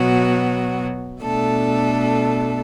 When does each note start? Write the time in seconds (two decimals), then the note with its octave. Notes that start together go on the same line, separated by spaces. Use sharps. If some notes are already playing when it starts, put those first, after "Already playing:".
Already playing: B2 F#3 B3 F#4
1.22 B2 A3 D4 A4